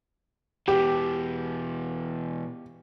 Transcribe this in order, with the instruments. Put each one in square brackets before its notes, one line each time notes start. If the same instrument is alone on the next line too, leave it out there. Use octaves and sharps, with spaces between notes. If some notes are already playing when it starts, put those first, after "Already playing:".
[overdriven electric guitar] B2 E3 [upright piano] G4